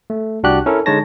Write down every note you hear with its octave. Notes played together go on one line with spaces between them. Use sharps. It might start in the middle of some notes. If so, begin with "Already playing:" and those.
A3
C2 D4 F#4 G4 F#6
C#4 E4 A4 A#4
D3 G#3 D#4 C#5 A5 A#6